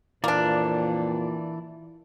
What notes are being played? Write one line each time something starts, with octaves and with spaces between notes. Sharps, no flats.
F2 A#2 E3 A#3 D4 D5